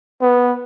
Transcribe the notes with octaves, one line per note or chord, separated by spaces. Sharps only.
B3